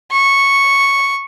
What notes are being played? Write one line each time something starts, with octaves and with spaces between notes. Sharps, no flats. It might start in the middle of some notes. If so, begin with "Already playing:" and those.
C#6